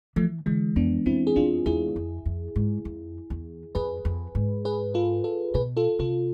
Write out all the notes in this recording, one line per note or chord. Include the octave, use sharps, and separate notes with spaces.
E3 F3 A3
D3 E3 G#3
F2 B3 D4
F2 C4 E4
G#4
F2 D4 F4
E2 E4 G#4
F2
F2
G#2
F2
E2
F2 G#4 B4
F2
G#2
G#4 B4
F4 A4
F4 A4
B2 G#4 B4
F4 A4
C3 F4 A4